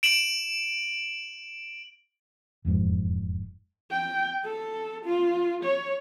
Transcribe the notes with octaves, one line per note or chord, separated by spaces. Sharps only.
D7 E7 F#7
E1 F2 G#2
G5
A4
F4
C#5